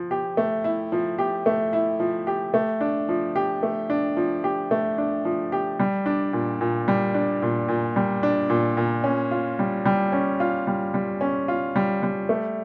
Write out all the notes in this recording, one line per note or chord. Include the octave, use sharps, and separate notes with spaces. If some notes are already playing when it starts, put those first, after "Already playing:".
Already playing: F3
G4
A3
E4
F3
G4
A3
E4
F3
G4
A3
D4
F3
G4
A3
D4
F3
G4
A3
D4
F3
G4
G3
D4
A#2
A#2
G3
D4
A#2
A#2
G3
D4
A#2
A#2
C#4
F4
G3
G3
C#4
F4
G3
G3
C#4
F4
G3
G3
A3